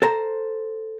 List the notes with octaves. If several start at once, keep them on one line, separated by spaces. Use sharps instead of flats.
A4 C5 A#5